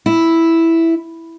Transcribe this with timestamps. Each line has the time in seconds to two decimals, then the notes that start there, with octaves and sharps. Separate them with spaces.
0.06 E4